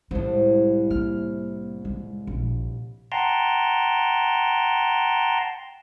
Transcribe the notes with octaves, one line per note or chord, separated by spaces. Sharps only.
C2 A2 G#3
A#3 F6
G#3
A#1
F#5 G5 A5 A#5 C6